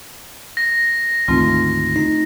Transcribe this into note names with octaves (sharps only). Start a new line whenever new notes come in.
A#6
D2 G#2 D#3 A3 C4 F4
D#4